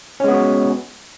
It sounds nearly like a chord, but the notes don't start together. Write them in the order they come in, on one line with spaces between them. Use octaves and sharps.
C#4 G#3 B3 F#4